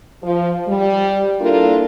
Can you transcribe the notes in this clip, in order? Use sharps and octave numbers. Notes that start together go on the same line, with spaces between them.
F3
G3
A#3 D4 E4 F4 A4 A#4